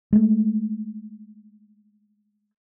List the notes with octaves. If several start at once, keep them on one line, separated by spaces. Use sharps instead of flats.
G#3 A3